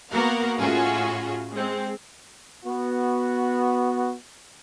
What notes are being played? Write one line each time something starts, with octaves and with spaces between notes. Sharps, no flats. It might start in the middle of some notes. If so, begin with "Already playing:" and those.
A#3 B3 F#4 A#4 F5 F#5
A2 C#4 F4 F#4 G#4
G#3 C4
B3 F#4